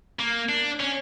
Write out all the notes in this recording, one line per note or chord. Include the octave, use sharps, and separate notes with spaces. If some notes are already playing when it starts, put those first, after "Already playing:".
A#3
D4
C#4